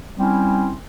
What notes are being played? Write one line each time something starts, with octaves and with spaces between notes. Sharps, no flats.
G3 C4 C#4 E4